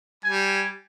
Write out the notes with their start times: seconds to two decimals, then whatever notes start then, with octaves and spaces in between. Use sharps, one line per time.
0.25 G3 G#5